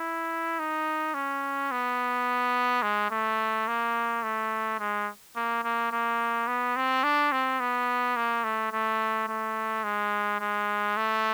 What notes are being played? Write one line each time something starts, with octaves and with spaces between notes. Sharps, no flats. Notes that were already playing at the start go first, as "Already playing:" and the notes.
Already playing: E4
D#4
C#4
B3
G#3
A3
A#3
A3
G#3
A#3
A#3
A#3
B3
C4
D4
C4
B3
A#3
A3
A3
A3
G#3
G#3
A3